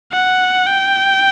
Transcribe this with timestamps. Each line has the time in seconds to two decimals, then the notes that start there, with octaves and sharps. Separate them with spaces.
0.12 F#5
0.66 G5